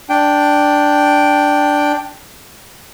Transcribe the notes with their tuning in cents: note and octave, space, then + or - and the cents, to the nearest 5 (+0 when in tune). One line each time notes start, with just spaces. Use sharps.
D4 +0 G5 +0